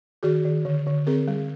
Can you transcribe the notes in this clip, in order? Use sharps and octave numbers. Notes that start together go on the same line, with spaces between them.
D#3 F#4 G#4
D#3
D3
D3
C4 G#4 A#4
G3